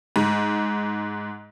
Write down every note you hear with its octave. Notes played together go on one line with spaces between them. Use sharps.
G#2